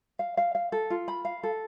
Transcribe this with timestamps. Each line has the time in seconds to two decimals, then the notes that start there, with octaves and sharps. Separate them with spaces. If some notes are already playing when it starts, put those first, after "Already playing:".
0.19 F5
0.37 F5
0.55 F5
0.72 A4
0.90 F4
1.08 B5
1.25 F5
1.43 A4